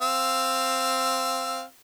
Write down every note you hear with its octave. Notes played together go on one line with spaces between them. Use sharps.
C4 F5 E6